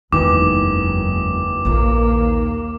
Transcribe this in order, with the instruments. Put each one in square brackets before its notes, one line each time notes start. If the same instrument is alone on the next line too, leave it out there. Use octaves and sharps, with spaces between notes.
[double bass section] F#1 [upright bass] E2 G#3 [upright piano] D#3 E3 [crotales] D6
[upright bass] A#1 F4 [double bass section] D#2 A#3